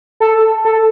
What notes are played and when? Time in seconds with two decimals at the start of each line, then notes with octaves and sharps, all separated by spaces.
0.20 A4
0.65 A4